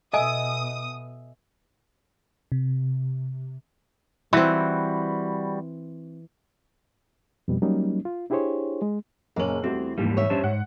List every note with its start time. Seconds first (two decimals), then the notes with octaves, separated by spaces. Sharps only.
0.14 B2 A4 D#5 E5 G#5 D#6
2.52 C3
4.33 E3 G3 C4 F#4 B4
7.48 F2 B2 G3
7.62 F#3 G3 A#3 C#4 D#4
8.05 F4
8.30 D4 E4 G4 G#4 C5 C#5
8.82 G#3
9.36 F#1 A#2 A#3 C#4 F#7
9.64 E2 G3 A3 C4 F#4
9.98 F1 D#2 G#2 E3 G3 A#3
10.17 C#5 E5
10.30 G2 C#4 C5 A5
10.44 G#2 F#5